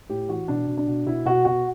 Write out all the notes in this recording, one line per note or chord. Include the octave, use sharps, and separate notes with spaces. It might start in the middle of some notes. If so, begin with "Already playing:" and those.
A2 G4
E3 F#4
B2 D4
B2
D4
B2
B2 E4
B2 F#4
B2 F#4